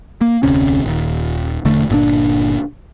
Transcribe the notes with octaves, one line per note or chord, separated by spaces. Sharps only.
A#3
F1 D2 C3 C#4
D#1 D#2
E1 D3 A3
G1 A#2 D4